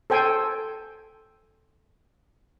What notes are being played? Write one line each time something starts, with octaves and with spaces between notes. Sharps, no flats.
A4 C5 G5 G#5